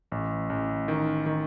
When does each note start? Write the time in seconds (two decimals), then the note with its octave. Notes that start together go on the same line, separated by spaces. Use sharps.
0.12 A1
0.50 A1
0.88 D#3
1.26 D#3